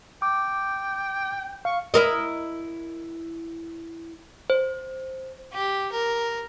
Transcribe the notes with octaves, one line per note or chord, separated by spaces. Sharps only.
G5 D6
F5 C#6
E4 A#4 D#5
C5
G4
A#4